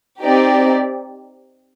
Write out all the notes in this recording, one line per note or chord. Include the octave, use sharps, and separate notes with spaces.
C4 D#4 G4 D5